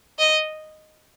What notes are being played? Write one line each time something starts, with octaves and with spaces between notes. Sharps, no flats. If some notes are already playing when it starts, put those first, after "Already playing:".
D#5